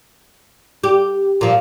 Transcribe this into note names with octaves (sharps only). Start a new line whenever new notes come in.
G4
A#2 F3